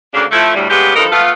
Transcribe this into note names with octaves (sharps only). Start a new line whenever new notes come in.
D2 C#3 A#3 D4
F3 A3 E4
D2 A2 G3
G3 G#3 A#3 B3 C#4 G4
G2 E3 F3 D#4 A4 A#4
A3 B3 F4